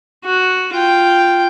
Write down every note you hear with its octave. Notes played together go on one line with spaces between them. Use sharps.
F#4
F4 G5